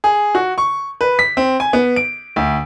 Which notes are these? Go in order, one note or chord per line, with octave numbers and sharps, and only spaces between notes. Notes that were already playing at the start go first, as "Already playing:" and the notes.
G#4
F#4
C#6
B4
B6
C4
G#5
B3
D7
D2